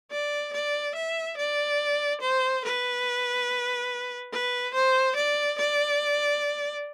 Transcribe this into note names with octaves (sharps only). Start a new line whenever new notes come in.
D5
D5
E5
D5
C5
B4
B4
C5
D5
D5